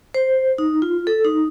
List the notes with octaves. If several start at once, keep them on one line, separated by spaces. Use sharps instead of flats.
C5
D#4
F4
A4
D#4